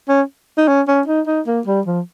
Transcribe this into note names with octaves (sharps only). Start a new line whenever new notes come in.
C#4
D#4
C#4
C#4
D#4
D#4
A#3
G3
F3